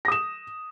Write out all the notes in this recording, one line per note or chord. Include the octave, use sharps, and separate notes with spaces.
D#6 A#6 E7